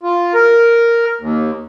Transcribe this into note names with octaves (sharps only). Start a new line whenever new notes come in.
F4
A#4
D#2